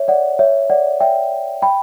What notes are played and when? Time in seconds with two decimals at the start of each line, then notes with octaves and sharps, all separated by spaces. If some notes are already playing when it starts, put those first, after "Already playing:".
Already playing: C#5 E5
0.08 D5 F#5
0.39 C#5 E5
0.70 D5 F#5
1.00 E5 G5
1.62 G5 B5